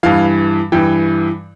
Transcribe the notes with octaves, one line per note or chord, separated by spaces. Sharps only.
G2 E3 F5
G2 E3 G5